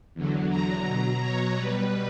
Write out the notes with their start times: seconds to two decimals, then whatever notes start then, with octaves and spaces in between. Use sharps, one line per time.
0.14 E2 D3 F#3
0.50 A#5
0.86 B2 F#3
1.21 C#5
1.56 B2 G3 B4